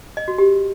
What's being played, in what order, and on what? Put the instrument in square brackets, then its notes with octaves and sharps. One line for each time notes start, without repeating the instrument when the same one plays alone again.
[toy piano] D#5
F#4
G4